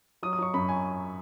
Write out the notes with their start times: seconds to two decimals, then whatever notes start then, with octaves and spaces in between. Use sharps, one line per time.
0.23 F#3 D#6
0.33 D#6
0.38 F#3 C#6
0.54 F#2 B5
0.68 G#5